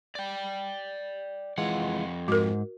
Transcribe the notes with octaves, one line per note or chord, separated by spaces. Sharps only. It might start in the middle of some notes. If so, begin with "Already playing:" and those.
D5 G5
F2 E3 G#3 F4 F#5
G#2 F#4 A#4